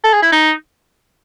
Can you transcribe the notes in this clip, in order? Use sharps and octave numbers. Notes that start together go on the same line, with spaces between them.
A4
G#4
E4
D#4